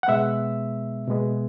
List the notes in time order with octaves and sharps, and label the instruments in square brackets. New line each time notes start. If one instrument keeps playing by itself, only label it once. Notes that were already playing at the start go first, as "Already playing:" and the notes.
[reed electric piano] F#5
B2 G#3 B3 E5
B2 G#3 B3